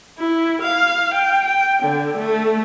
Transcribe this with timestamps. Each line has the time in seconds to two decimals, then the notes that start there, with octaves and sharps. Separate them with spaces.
0.19 E4
0.62 F5
1.14 G5
1.45 G5
1.83 D3
2.17 A3